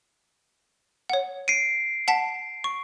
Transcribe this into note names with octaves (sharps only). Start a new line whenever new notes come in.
C#5 F#5
C7 D7 D#7
F#5 A5 B6
C#6